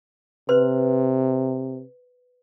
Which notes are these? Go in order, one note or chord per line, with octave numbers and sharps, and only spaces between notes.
C3 B4 C5 C6